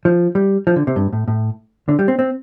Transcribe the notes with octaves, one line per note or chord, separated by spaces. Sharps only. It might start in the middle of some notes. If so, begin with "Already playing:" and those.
F3
G3
F3
D3
C3
G2
A2
A2
D3
G3
C4
C4